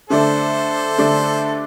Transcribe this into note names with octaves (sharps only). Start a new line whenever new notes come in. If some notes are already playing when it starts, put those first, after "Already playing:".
D3 A3 D4 A4 C5
D3 A3 D4